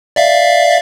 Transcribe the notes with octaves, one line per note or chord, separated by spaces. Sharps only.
D5 E5 F5